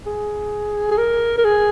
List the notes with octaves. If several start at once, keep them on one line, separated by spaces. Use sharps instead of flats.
G#4
G#4
A#4
A#4
G#4